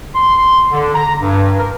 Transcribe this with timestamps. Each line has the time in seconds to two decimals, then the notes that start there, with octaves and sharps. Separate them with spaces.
0.14 C6
0.71 D3
0.94 A#5
1.22 G2
1.58 A#4